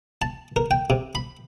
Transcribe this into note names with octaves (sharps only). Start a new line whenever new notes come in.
A5
A#4
G5
C3
B5